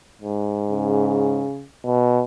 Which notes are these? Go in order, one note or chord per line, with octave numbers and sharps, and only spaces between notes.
G#2
C#3
B2